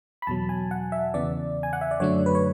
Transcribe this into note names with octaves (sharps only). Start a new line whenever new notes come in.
B5
E2 B2 F#3 A5
G#5
F#5
E5
E2 C#3 E3 B3 D5
G#5
F#5
E5
D5
F#2 D3 F#3 A3 D4 C#5
B4
C#5